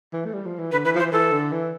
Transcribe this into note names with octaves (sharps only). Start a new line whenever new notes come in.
E3
A3
G3
F3
E3
D3 B4
E3 B4
F3
E3 C5
E3 A4
D3
E3